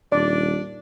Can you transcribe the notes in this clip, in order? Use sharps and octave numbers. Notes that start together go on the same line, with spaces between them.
D#1 D4 D5